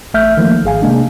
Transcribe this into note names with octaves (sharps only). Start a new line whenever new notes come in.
A1 A3 E5 F6 G6
D#3 F3 A3 A#3
G#1 G#4 F5 G#5
C3 G#3 A#3 D4